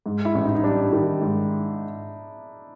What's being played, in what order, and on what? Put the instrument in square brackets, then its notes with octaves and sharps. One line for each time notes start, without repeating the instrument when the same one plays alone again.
[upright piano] G#2
[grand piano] E4
[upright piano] A1
[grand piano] D#4
D#4
[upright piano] G3 [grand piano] D4
[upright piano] D#3
G#2